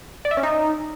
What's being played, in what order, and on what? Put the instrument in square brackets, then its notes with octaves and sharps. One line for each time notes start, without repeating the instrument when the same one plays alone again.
[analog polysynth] D5
E5
C#4
D#4